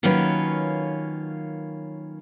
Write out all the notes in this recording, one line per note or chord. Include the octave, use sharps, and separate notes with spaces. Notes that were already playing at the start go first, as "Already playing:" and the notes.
D#3 F#3 A#3 C#4 F4 B4